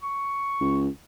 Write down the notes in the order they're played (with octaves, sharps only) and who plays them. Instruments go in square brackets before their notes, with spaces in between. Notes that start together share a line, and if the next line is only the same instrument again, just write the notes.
[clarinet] C#6
[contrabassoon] C#2